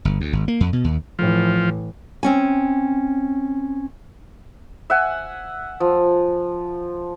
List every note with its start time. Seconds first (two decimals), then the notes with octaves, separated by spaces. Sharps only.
0.05 G1
0.21 D2
0.33 G#1
0.48 A#3
0.60 F2
0.73 B2
0.84 D#2
1.19 A2 E3 F3
2.23 C4 C#4 G#5
4.90 E5 F#5 G#5
5.80 F3